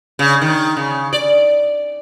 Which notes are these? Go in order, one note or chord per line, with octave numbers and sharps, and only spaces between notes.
C#3
D#3
C#3
D5